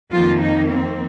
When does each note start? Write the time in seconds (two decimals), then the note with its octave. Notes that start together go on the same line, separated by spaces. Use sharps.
0.12 F2 D#3 F3 A#3 F4
0.41 D#4
0.70 C4